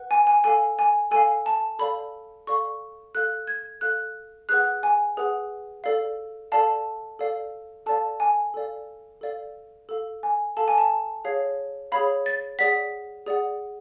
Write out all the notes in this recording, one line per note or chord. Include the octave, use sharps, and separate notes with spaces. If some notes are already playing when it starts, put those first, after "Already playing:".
Already playing: B4 F#5
G#5
G#5
A4 F5 G#5
G#5
A4 F5 G#5
A5
A4 D5 F5 B5
A4 D5 F5 C#6
A4 F5 F#6
G#6
A4 F5 F#6
G#4 B4 F#5 F#6
G#5
G#4 B4 F#5
A4 D5 F5
A4 D5 F5 A5
A4 D5 F5
A4 D5 F5 A5
G#5
A4 D5 F5
A4 D5 F5
A4 F5
G#5
A4 F5 A5
G#5
A5
G#4 C#5 F5
G#4 C#5 F5 B5
A6
G#4 D5 F#5 B6
G#4 D5 F#5